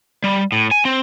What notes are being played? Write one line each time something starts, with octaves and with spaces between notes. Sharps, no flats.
G3
A2
G#5
C4